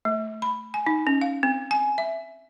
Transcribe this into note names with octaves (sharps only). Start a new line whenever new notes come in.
A3
B5
G#5
D#4
C#4
F5
C4
G#5
E5